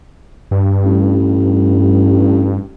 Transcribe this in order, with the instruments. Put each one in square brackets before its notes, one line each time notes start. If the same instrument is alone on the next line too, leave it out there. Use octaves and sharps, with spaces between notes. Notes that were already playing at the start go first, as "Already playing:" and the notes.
[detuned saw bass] G2
[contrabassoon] A1